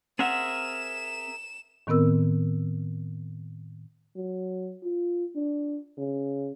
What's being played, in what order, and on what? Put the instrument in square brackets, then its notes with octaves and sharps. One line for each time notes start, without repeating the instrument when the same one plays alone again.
[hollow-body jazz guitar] C4 F#5 [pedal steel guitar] G#4 A#4 E5 [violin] E7
[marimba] A2 D#3 B3 C4 A#4 E6
[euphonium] F#3
F4
D4
C#3